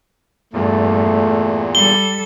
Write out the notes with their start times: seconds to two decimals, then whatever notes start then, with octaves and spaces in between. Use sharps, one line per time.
0.53 E2 G2 A#2 A3
1.75 G3 A4 G7